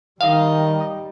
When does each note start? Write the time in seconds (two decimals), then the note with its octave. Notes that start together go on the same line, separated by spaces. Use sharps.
0.21 D#3 G3 D#4 D#5 F5